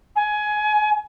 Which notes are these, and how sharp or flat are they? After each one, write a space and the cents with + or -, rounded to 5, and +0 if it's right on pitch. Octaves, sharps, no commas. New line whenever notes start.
G#5 +20